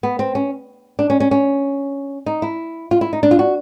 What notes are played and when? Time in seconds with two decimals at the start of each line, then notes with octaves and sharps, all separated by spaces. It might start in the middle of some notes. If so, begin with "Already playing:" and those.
0.03 B3
0.19 C4
0.35 C#4
0.99 D4
1.10 C#4
1.20 C#4
1.31 C#4
2.26 D#4
2.42 E4
2.91 F4
3.01 E4
3.13 D#4
3.23 D4
3.31 F4
3.39 F#4